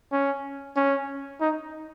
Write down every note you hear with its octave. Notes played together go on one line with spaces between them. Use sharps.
C#4
C#4
D#4